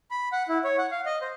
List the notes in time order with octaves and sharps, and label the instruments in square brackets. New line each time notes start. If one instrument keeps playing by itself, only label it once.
[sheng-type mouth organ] B5
F#5
E4
C#5
F#5
F5
D#5
C5